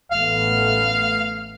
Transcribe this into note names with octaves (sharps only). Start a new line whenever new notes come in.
A1 A3 B3 F5